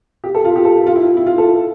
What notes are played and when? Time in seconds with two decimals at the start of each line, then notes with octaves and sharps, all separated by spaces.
0.24 G4
0.35 A4
0.45 F4
0.56 G4
0.65 A4
0.87 F4
0.96 E4
1.17 E4
1.27 F4
1.38 A4